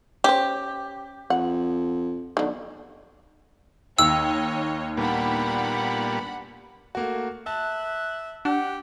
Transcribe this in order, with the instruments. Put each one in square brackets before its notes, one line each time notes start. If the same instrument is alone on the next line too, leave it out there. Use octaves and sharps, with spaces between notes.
[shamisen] C#4 C5 [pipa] G4
[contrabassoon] F2 [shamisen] F#5
[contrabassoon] B1 [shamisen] D3 D#3
[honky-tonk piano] D#2 [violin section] C#5 D#5 [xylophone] E6
[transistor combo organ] A#2 G3 B3 [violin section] D4 F#5 B5
[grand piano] A3 A#3 F#4
[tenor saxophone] E5 [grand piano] A5 [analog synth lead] F#6
[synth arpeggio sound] D4 [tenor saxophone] G4 [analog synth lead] F#5